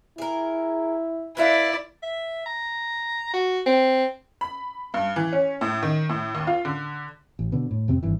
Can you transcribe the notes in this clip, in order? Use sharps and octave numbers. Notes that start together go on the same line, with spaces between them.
E4 G#4 A#4
E4 B4 D5 E5 F5
E5
A#5
F#4
C4
B5
G2
E3
C#4
A2
D#3
A2
D#2
F4
D3
A1
B2 D3
A2
F2 C3 C4
G#1 G2 E3